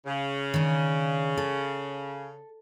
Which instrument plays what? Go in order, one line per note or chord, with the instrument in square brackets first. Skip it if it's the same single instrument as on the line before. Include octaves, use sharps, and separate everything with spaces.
[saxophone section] C#3
[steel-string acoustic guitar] D#3 D4
A4